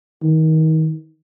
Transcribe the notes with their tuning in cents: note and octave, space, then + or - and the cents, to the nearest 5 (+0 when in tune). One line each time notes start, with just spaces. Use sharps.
D#3 +30